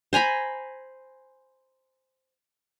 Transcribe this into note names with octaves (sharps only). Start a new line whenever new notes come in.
C5 G#5 A#5 B5